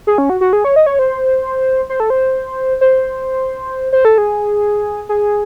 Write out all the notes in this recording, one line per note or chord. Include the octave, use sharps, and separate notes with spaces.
G#4
C#4
F#4
F#4
G#4
C#5
D#5
C#5
C5
C5
A4
C5
C5
C5
A4
G#4
G#4